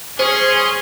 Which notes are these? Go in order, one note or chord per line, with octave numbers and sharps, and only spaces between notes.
C#4 G#4 C5 C6 C#6 D#6